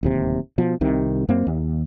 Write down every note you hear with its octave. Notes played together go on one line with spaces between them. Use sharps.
D1 D#2 C3
B2 F3
C2 C3 D#3
F#2 A#3 C4
D#2